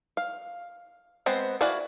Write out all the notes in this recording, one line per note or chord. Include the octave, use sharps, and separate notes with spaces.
F5
G#3 B3 C4 C5
E4 F#4 D5 F5 G#5